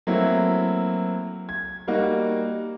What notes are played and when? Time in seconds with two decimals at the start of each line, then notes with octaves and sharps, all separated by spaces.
0.07 F#3 A3 A#3 C4 E4
1.49 G#6
1.87 G3 A#3 D#4 F#4